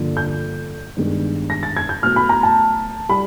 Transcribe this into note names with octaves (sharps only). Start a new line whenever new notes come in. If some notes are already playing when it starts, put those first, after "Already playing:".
Already playing: G2 D3 F3 A#3
G6
G2 D#3 G#3 B3
A#6
A6
G#6
G6
A2 F#3 B3 F6
B5
A#5
A5
G3 B5